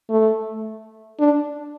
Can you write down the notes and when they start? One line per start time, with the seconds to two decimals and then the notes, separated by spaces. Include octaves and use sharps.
0.10 A3
1.20 D4